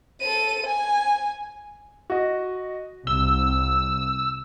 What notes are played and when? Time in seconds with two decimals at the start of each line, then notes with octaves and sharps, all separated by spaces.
0.21 A4 D#7
0.66 G#5
2.10 F#4 D#5
3.07 C2 E6 G7